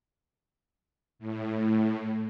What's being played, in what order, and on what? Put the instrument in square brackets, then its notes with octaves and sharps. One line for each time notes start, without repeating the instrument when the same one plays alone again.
[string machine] A2